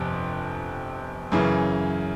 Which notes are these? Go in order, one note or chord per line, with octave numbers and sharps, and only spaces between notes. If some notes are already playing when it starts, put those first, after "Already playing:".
Already playing: G1 F2 C3
F#2 C#3 E3